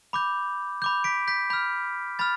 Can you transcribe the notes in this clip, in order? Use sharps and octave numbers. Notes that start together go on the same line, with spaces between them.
B5 D6 G6
B5 D6 G6
B6 D7
G6 B6
B5 F6 G6
B5 F6 A6